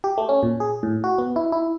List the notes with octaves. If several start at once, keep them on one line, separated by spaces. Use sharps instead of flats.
G4
A3
C#4
A#2
G#4
A2
F#4
B3
E4
E4